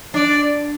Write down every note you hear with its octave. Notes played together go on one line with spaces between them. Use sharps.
D4 D5